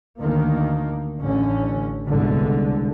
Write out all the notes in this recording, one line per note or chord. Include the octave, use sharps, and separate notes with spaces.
D2 D#3 A#3
A1 D3 C#4
C2 G#2 B2 D3